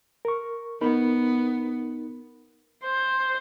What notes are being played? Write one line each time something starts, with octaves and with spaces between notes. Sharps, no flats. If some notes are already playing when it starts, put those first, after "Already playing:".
A#4 C#6
B3 D#4 A#4 B5
C5